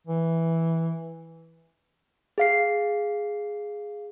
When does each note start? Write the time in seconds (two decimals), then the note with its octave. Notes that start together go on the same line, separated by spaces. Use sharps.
0.07 E3
2.38 G#4 F5 C7